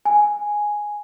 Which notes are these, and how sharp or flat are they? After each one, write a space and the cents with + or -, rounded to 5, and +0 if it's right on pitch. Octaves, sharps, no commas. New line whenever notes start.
G#5 +0